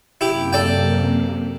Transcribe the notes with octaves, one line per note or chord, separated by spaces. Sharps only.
F#2 C3 A#3 E4 G4
A4 D5 G5